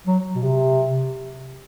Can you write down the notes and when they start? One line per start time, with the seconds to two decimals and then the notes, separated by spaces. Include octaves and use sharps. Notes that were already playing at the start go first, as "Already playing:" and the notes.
0.07 F#3
0.35 B2
0.43 C3